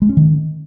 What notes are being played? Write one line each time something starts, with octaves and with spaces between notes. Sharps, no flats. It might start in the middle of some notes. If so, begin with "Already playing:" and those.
G#3
C#4
D#3